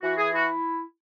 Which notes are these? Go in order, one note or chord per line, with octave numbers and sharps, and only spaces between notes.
E3 F#4
G#4
E4 F#4